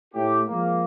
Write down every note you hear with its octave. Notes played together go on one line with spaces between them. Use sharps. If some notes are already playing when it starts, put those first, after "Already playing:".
A2 G4
F3 G#3 A#3